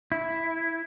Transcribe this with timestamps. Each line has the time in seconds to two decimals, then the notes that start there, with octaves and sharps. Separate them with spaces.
0.12 E4